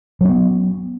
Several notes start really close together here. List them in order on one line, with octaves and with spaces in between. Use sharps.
F#3 C#4 B3